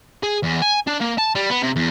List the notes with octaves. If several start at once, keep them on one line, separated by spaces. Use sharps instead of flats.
G#4
E2
G#5
D4
A#3
A5
G3
B3
C3
E2